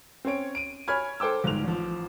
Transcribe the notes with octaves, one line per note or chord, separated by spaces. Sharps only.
C4 C#4 C#5 D7
D7 D#7
C#5 G#5 B5 F6 G#6
A4 C5 G5 D6 E6
G1 G#2 F7
A1 F3